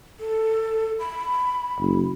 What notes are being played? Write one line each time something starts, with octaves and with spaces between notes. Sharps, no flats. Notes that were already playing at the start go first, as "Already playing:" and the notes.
A4
B5
F#1